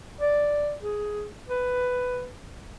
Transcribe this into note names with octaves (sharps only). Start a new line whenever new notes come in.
D5
G#4
B4